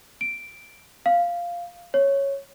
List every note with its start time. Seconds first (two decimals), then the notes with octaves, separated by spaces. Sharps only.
0.21 D7
1.06 F5
1.94 C#5